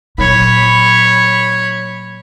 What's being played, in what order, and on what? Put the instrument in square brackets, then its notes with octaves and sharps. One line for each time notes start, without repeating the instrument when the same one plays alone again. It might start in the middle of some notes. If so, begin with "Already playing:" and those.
[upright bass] A#2 F#3 [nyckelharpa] C#5 B5